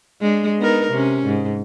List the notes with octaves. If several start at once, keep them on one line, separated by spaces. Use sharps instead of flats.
G#3 D4
B3 D#4 A#4
C3 C#4
G#2